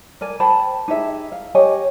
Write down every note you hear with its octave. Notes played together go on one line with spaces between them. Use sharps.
A#4 D5 G#5
C5 G5 A5 B5
D#4 G4 G#4 E5
F5
G4 C#5 D#5 G#5